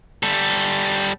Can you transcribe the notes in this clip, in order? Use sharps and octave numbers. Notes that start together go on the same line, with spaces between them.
G3 A4